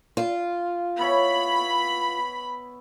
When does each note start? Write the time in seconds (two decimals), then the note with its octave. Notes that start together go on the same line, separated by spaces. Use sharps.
0.17 F4
0.99 B3 E4 C#5 B5